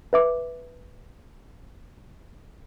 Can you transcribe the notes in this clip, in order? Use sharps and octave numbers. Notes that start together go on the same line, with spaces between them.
B4 E5 D6